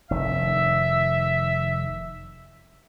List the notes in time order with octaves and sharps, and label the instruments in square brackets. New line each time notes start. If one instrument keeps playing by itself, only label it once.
[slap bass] F1 D#3 [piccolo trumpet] E5